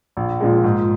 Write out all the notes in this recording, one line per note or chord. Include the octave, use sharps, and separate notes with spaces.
A#1
A#2 F3 G#3
G#2